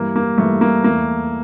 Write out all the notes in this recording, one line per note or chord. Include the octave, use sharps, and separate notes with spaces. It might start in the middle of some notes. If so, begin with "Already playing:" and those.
Already playing: G2 E3 G3 A#3
A#3
G2 E3 G3 A3
A#3
E2 E3 A3 A#3